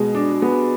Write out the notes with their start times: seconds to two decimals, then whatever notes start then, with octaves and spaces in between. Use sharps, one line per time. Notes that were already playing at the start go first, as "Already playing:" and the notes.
Already playing: B2 G#3 B3
0.15 D4
0.42 B3